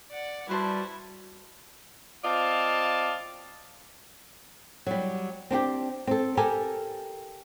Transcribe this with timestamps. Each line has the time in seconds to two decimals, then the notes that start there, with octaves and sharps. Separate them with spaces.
0.11 D5 F#5
0.49 G3 E4 F#4 B4 C5 A5
2.24 C4 F4 D5 D#5 F5 A5
4.87 F#3 G3
5.51 C4 D4 F#4 G4
6.07 C4 A4
6.37 G4 A4 A#4 G#5